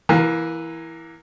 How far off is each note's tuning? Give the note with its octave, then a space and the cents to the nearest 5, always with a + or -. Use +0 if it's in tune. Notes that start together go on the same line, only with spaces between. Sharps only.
E3 +0 A#3 +20 A#5 -20